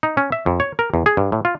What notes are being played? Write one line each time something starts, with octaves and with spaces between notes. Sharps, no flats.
D#4
C#4
E5
F2
C#5
A#4
E2
G#4
G2
A2
F4